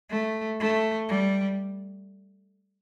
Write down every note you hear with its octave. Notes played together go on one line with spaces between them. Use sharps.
A3
A3
G3